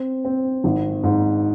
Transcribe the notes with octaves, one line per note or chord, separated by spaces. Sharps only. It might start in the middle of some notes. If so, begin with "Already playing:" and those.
Already playing: C4
C4
G#1
G#2